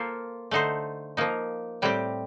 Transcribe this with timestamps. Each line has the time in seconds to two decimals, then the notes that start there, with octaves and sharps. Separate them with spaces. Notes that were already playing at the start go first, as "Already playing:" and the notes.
Already playing: A#3 F4 A4 C5
0.51 D3 A3 D#4 A4 C5
1.17 F3 A#3 D#4
1.82 A2 G3 C4 G4